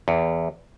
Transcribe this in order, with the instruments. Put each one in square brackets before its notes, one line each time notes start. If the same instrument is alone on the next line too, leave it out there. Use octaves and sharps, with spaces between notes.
[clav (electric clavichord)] E2